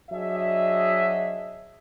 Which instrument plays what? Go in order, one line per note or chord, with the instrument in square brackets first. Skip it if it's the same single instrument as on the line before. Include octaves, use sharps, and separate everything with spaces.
[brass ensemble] F#3 D4 F#4 G#4 D#5 E5